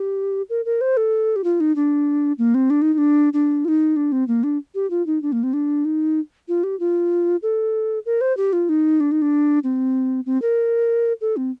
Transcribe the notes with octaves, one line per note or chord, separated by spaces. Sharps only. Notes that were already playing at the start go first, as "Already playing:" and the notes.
Already playing: G4
A#4
A#4
C5
A4
G4
F4
D#4
D4
A#3
C4
D4
D#4
D#4
D4
D4
F4
D#4
D4
C4
A#3
D4
G4
F4
D#4
D4
A#3
C4
D4
D#4
F4
G4
F4
A4
A#4
C5
G4
F4
D#4
D4
D#4
D4
C4
C4
A#4
A4
C4